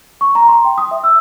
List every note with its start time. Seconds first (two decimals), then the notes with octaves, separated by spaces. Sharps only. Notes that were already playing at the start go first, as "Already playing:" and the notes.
0.21 C#6
0.35 A#5
0.48 C6
0.65 G5
0.78 D#6
0.91 E5
1.04 E6